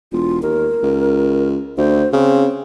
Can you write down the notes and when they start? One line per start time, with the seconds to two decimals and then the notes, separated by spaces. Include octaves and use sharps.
0.12 E1 F4
0.42 D#2 A#4
0.83 C#2
1.78 D2 C5
2.13 C#3 C4